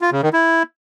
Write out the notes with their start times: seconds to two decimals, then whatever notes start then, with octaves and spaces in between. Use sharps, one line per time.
0.01 F4
0.12 C#3
0.22 D#3
0.33 E4